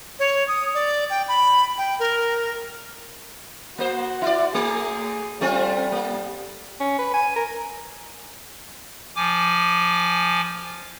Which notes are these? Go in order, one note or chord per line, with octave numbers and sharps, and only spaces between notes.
C#5
D#6
D5
G5
B5
G5
A#4
A#3 F#4 C5
E4 D5
A3 G#4
G3 A3 C4 F4
A#3
C#4
B4
G#5
A#4
F3 G#5 D6